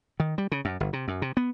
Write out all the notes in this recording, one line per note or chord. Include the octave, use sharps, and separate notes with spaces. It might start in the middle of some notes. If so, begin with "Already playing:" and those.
D#3
G3
C#3
F#2
G1
C3
F#2
C3
B3